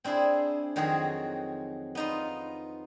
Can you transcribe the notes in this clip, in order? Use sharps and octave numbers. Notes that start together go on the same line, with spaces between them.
C4 D4 E4 G#4
F2 D#3 F#3 C4 F#4 G#4
B3 D#4 F4